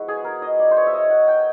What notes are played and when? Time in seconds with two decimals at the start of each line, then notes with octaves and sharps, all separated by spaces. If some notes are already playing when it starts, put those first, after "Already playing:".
Already playing: F3 G#3 B3 E4 F#4
0.08 G#4
0.24 A#4
0.42 D#5
0.59 D5
0.71 C5
0.77 C#5
0.87 E5
0.93 D#5
1.10 F#5
1.28 G5